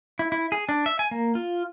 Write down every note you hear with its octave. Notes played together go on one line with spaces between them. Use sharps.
E4
E4
G#4
D4
E5
G#5
A#3
F4